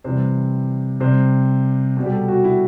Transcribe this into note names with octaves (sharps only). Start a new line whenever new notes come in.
C3 E3 G3 C5
C3 G3 C5
B2 G3
G4
A4
F#4
E4